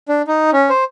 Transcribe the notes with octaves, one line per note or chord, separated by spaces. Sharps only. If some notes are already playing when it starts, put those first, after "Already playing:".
D4
D#4
C#4
C5